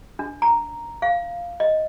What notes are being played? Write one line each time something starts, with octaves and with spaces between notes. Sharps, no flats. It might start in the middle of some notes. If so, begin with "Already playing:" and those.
D4
A#5
F5
D#5